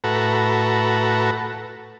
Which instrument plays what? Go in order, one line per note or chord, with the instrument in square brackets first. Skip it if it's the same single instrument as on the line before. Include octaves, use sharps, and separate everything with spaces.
[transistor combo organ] A2 F#4 A4 B4 A#5